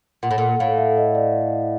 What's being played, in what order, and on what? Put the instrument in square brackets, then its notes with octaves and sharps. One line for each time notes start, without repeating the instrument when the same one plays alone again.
[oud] A#2 [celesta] F#5
[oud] A2
[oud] A#2 [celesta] F#5
[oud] A2 [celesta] F5
[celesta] E5
D#5
D5